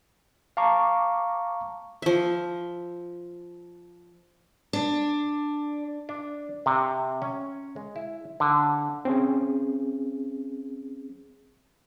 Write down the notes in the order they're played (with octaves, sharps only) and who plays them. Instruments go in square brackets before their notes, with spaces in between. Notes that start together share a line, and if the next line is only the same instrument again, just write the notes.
[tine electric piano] F5 A5 A#5 C#6 D6
[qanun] F3 E5
[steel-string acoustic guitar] D4
[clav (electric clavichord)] D4
C3
C#4
G#3
E4
D3
[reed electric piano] C4 C#4 G#4